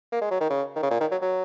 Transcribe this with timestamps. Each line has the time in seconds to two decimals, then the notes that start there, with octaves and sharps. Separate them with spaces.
0.12 A#3
0.21 G#3
0.30 F#3
0.41 D#3
0.50 C#3
0.76 D#3
0.83 C#3
0.91 A#2
1.01 D#3
1.11 F#3
1.21 F#3